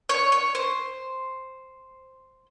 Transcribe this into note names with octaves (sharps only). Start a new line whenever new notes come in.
C#5
C#5
C5